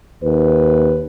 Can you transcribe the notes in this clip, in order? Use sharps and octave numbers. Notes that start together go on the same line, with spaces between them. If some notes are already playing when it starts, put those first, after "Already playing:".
D#2 B4